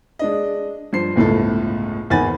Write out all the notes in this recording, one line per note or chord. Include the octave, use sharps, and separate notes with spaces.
G#3 D4 D#5
G2 F3 C5 C7
G1 C#2 A2 E4 A4
G#1 E2 D#3 G#5 B5 A6